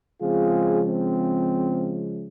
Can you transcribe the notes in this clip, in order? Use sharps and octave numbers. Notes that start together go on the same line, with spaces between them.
C#3 F3 G#3 C4 F4 G#4
C4